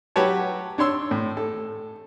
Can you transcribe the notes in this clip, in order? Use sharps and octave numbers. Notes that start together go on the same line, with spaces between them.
F#3 G4 B4 C#5 A5
D4 C#5 C6 E6
A2
A4